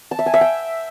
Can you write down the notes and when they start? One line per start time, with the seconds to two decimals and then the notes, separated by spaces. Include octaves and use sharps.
0.11 A5
0.19 E5
0.26 G#5
0.34 E5
0.41 G5